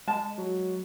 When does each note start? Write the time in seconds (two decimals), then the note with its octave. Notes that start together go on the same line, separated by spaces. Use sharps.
0.08 G#3 A5
0.38 F#3